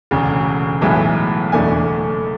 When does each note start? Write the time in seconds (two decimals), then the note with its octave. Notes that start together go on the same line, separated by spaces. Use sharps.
0.11 E1 D2 C#3
0.82 B1 A2 E3 G#3 B3
1.52 F#1 E2 B2 A3 D4 G#5